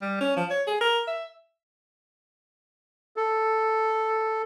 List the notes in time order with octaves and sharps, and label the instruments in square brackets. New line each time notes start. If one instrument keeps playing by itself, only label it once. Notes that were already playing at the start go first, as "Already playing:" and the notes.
[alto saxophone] G3
C#4
F3
C#5
G#4
A#4
E5
[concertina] A4